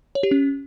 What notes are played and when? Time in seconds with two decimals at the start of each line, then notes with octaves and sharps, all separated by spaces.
0.15 C#5
0.23 G4
0.31 C#4